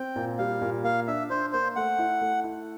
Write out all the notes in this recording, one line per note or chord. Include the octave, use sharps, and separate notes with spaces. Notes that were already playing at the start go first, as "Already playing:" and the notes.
Already playing: C4 G5
A#2
G3 F5
A#2
A#3 F5
D4 E5
D4 C5
A#3 C5
A3 F#5
E4
A3
E4